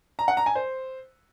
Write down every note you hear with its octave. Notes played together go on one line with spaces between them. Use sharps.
A#5
F#5
A#5
G#5
C5